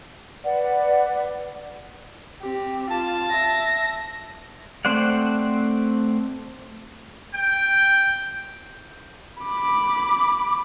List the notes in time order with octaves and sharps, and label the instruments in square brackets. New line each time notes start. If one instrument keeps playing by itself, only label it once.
[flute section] B4 D5 F#5
[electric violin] C4 G4
[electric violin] F4 [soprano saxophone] A5
[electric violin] E5 A#6
[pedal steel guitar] A3 C4 C5 D5 F#5
[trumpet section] G5
[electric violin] B5 D6